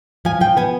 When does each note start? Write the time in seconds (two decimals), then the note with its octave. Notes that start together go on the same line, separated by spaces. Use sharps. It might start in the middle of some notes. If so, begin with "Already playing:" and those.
0.25 F3 G#5
0.41 F3 G5
0.57 B3 G#5